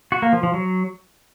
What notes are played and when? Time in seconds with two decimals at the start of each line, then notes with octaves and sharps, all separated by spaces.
0.12 F#4
0.22 A#3
0.33 F3
0.43 F3
0.54 F#3